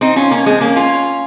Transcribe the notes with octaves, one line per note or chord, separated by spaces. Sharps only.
C4 D#4
C#4 F4
A#3 C#4
G#3 C4
A#3 C#4
C#4 F4